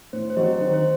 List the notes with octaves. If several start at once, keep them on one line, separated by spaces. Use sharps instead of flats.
A2 C5
C5
F#3 C4 F#4 D#5
D#3 C5
C5